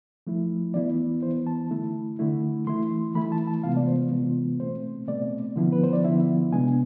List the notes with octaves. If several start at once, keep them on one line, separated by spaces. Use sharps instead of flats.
F3 A3 E4
E3 B3 E4 D5
E3 B3 E4 C5
A5
D3 A3 E4
D3 A3 E4
E3 A3 E4 C6
E3 A3 E4 B5
A5
A5
C3 E3 G#3 B3 F4 F5
D5
C5
C3 E3 G#3 B3 F4
B2 A3 C4 C5
B2 A3 C4 D5
D3 F3 B3 E4
B4
C5
D5
D3 F3 B3 E4 E5
C3 G#3 B3 D4 G#5